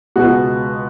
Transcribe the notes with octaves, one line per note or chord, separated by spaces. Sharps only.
C#2 B2 G#3 B3 F#4